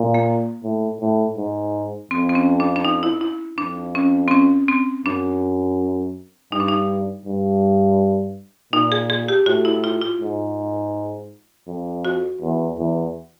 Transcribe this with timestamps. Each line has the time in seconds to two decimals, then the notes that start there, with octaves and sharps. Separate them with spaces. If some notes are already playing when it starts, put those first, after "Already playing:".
Already playing: A#2
0.14 A#3
0.64 A2
1.00 A2
1.37 G#2
2.11 F2 C4
2.29 C4
2.35 C#4
2.60 D4
2.76 D4
2.85 D#4
3.03 E4
3.21 E4
3.58 F2 D4
3.95 C#4
4.28 C4
4.31 C#4
4.68 C4
5.05 F#2 D4
6.52 G2 D#4
6.60 D4
6.68 D#4
7.26 G2
8.73 A#2 D#4
8.92 G#4
9.10 G#4
9.28 G4
9.46 A2 F#4
9.65 E4
9.84 F4
10.02 F4
10.20 G#2
11.67 F2
12.05 F#4
12.41 E2
12.78 E2